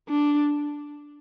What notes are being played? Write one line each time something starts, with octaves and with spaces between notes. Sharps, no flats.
D4